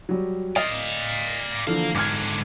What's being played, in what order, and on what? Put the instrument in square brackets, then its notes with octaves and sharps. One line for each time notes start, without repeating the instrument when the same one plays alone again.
[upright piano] F#3 G3
[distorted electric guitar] D5 F5 [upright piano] D#5
[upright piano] D3 E3 F3 [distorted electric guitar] A#3 F5
[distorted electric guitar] G#2 D3 [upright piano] D6 F6 G#6